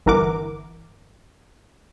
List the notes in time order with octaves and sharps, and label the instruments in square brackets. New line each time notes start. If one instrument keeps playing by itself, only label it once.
[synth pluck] G1 E3 A#4 F#5 D6